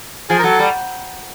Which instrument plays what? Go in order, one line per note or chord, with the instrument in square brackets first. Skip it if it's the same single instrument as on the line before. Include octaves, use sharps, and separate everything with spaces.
[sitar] F3 [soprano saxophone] G#4
[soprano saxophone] A#4
[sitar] F#3 [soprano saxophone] A4
[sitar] G3